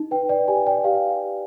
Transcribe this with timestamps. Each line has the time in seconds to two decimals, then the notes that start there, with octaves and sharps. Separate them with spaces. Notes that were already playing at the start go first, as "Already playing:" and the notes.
Already playing: D#4
0.11 B4 G5
0.29 D5 G5
0.48 G4 G#5
0.67 D5 G5
0.84 G4 F5